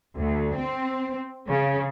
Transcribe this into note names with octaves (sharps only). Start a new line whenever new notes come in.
D2
C4
C#3